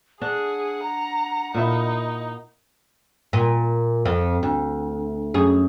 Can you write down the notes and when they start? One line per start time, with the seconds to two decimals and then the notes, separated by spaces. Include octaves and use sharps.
0.21 D4 G#4 F#5
0.83 A#5
1.55 A#2 D#4 E4
3.33 A#2
4.05 F2
4.43 D2
5.34 F#2 G#4